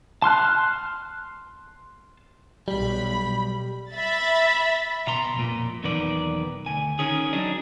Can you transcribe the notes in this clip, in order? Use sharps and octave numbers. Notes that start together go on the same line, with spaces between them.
A5 C6 F6 F#6
B1 G3 B5
E5 B5 A6
B2 A#5 C6
F2 A#2
B1 E2 D#3 B4 D5
D2 G#5
D#3 C#4 G#4
F#3 D4 D#4